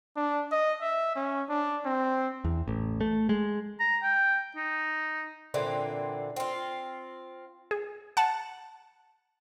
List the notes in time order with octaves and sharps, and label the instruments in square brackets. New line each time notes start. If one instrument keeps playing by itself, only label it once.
[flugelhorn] D4
D#5
E5
C#4
D4
C4
[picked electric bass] E2
A1
A3
G#3
[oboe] A#5
G5
D#4
[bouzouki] A#2 D3 E3 C4
C4 F4
[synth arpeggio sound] G#4
F#5 A5